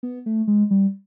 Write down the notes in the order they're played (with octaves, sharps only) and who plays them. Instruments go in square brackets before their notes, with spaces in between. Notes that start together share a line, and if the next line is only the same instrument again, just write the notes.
[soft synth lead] B3
A3
G#3
G3